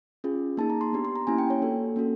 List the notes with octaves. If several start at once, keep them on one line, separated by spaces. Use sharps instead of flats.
C#4 F4 G#4
A#3 D#4 G#4 A5
A#5
C6
B3 D4 G4
C6
A#5
A#3 C#4 E4 G4 G#5
G5
C#5
A#3 D4 F#4 A4
A#3 C#4 F#4 A4